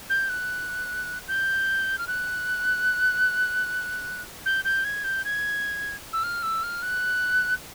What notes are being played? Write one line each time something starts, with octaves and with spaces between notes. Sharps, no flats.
G6
F#6
G6
F6
F#6
G6
G6
G#6
G6
G#6
E6
F6
E6
F6
F#6